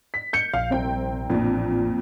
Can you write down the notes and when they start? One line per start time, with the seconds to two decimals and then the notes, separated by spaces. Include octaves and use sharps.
0.14 B6
0.33 G6 C#7
0.53 A#1 F5
0.70 C2 C4 G5
1.30 A1 F2 A#2 D4